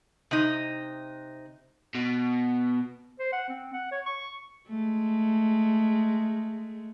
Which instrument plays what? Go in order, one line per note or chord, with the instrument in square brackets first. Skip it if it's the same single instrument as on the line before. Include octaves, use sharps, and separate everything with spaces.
[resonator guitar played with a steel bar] C3 D#4
[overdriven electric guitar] B2
[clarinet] C5
F#5
C4
F#5
C#5
C#6
[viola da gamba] G#3 A3